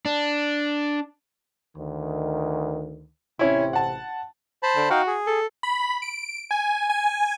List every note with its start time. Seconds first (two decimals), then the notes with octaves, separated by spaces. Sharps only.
0.06 D4
1.76 D2 D#3
3.39 A1 C3 C4 C#4 E4
3.73 F#5 A5
4.63 C5 A5 B5
4.76 D3
4.90 D#4 F#4 F5 G5
5.07 G#4
5.27 A4
5.63 B5
6.02 D7
6.51 G#5
6.90 G#5